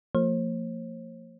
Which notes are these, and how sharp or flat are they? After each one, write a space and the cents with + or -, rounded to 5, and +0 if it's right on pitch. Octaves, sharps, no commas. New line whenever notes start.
F3 +0 A#3 -40 C5 +40